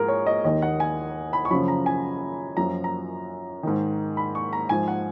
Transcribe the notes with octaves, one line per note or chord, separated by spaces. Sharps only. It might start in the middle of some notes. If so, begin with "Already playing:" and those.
Already playing: G#2 F3 G#4 A#4
C#5
D#5
D#2 D#3 D#5
F#5
G#5
B5
C#6
F#2 C#3 F3 B5
A#5
G#5
F#2 F3 A#5
A#5
G#2 D#3
B5
C#6
A#5
G#2 F3 G#5
F#5